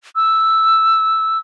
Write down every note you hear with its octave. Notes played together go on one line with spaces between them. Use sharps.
E6